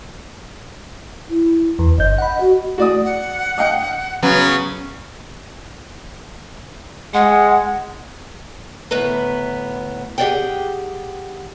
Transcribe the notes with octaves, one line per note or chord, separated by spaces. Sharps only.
E4
E2
G1 D#5 G6
F#5 B5
F#4
F#4 D5 D#6
F#5
D#5 F5 G5
C#3 F#3 B3
G#3 F#5
D2 A2 B3 B4 A#5
G4 G#4 A#4 D5 F#5 G5